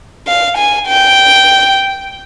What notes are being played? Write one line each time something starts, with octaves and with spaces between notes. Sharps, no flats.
F5
G#5
G5